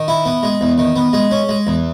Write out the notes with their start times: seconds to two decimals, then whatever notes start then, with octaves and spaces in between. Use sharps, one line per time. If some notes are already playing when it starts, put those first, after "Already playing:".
Already playing: D#3
0.08 E4
0.26 B3
0.43 G#3
0.61 E2
0.78 D#3
0.96 B3
1.13 G#3
1.31 C#4
1.49 G#3
1.67 E2